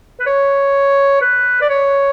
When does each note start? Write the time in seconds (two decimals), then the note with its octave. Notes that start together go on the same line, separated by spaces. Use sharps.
0.20 B4
0.26 C#5
1.21 B4
1.61 D5
1.69 C#5